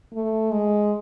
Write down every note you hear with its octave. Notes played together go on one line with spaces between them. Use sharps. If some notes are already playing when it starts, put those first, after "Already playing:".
A3
G#3